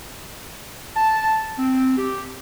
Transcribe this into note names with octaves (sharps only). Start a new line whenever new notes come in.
A5
C4
G4